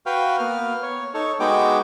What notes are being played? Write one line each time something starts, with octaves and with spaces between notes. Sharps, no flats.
F#4 B4 F5 G5
A#3 B3 F6
C#5
D#4 A4 C#5
G#3 B3 D#4 F#4 G5 D6